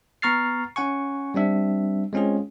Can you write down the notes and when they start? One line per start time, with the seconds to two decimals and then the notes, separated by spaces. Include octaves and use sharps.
0.22 B3 A#5 C#6 F6 A6 C7
0.76 C#4 F#5 G#5 C#6
1.34 G3 C4 D4 E5
2.13 G#3 C4 C#4 F4 G#4